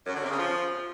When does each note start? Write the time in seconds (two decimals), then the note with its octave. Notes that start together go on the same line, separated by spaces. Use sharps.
0.06 F#2
0.14 D3
0.22 C3
0.30 C#3
0.38 F3